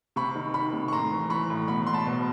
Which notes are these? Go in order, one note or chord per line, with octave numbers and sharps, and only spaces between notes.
C3 B5 C#6
D#3
D#3 B5 C#6
C3
C#6
A2 A#5 C6
E3
E3 B5 C#6
A2
B2 B5 C#6
B2 C6
A5 B5
B2